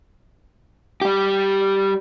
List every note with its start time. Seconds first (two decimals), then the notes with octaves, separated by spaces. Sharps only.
1.02 G3 G4